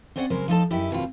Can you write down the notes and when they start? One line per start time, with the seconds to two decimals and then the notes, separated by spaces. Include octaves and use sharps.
0.16 C4 C#4 C5 D5 D#5 F#5
0.30 C#3 F#3 G#3 A#4 C5
0.48 F3 D#4 A4 A5
0.71 F#2 D#4 E4 G4
0.91 D#2 B2 C4 F4